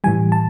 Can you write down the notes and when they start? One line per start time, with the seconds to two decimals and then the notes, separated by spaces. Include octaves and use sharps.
0.04 A2 E3 G3 G#5
0.32 A5